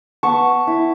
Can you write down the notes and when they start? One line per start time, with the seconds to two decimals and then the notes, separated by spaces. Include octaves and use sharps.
0.23 B3 A5 C#6
0.67 E4